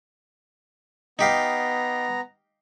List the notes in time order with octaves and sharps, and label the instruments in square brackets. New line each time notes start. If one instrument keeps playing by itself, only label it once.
[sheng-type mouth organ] B3 A#5 [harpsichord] D#4 G4 F5